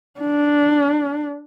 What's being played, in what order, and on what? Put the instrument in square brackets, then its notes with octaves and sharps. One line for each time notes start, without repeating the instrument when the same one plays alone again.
[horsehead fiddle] D4